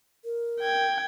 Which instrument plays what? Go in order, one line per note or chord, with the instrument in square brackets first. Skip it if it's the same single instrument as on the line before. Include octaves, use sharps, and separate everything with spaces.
[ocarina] A#4
[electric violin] G5 G#6